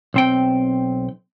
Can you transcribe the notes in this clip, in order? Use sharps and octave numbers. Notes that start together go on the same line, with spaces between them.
B1 C4 G5